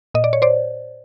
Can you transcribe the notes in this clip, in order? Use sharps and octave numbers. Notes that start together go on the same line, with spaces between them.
A#2 D#5
D5
C#5
C5 D5